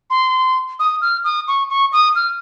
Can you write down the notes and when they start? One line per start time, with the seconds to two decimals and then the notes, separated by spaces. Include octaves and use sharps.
0.10 C6
0.79 D#6
1.01 F6
1.24 D#6
1.48 C#6
1.70 C#6
1.93 D#6
2.16 F6